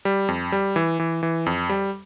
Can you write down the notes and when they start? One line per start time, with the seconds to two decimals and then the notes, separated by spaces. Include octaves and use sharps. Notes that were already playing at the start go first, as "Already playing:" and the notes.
0.05 G3
0.28 F2
0.52 G3
0.76 E3
1.00 E3
1.23 E3
1.46 F2
1.70 G3